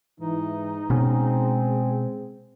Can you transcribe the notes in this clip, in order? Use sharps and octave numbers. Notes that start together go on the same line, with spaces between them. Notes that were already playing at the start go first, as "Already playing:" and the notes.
G#2 E3 D#4
B2 G#3 C4 C#4 G#4